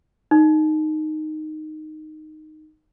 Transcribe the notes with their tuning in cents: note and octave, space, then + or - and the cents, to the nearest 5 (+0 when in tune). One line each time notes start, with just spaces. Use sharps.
D#4 -10